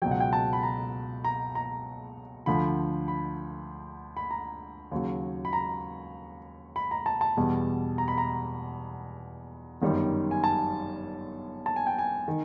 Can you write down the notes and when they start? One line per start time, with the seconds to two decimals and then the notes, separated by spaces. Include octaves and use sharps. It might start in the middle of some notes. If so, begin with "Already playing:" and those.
0.02 C#2 B2 F#3 G5
0.11 F#5
0.20 G5
0.33 A5
0.53 B5
0.63 A#5
1.24 A#5
1.55 A#5
2.46 D2 D3 F3 B5
3.08 B5
4.17 B5
4.31 A#5
4.91 D#2 C#3 F#3
5.45 B5
5.53 A#5
6.76 B5
6.91 A#5
7.06 A5
7.21 A5
7.37 E2 B2 G3
7.98 A#5
8.08 B5
8.18 A#5
9.82 G1 F#2 D#3 G3
10.31 G#5
10.44 A5
11.66 A5
11.76 G#5
11.87 G5
11.98 G#5
12.28 D#3